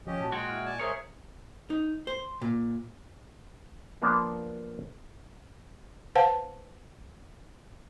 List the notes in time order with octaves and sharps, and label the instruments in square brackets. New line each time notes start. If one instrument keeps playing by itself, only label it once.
[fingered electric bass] F3 [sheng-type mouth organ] C#4 G4 D#5
[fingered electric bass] A#2 [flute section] F#4 A5
[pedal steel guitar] G#3 F#4 [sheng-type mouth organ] G5 [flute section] C6
[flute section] E4 F6
[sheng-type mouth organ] D5 G#5 A5
[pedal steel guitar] G#3 G#4 C#5 [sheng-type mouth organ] A#4 [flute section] C5 E5 D#6
[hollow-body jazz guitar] D#4
C5
A#2
[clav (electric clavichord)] F3 A#3 B3 D4 A#4 C5
[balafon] B4 C5 F5 F#5 A5